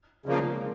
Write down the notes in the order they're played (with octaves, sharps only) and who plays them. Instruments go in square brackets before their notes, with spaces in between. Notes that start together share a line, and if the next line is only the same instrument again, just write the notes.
[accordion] C#3 F3 A#3 [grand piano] C4 D4
[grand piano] G#3 A#3